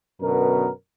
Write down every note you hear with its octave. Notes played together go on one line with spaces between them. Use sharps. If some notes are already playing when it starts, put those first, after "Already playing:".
F#2 B2 D3 B3 A#4